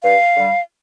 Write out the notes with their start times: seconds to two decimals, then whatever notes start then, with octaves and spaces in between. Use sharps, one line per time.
0.03 G2 F5
0.36 D3 G3